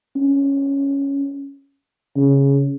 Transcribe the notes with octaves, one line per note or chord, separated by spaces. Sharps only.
C#4
C#3